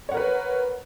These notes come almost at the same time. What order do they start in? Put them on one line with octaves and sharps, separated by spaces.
C#5 F#5 A#4 B4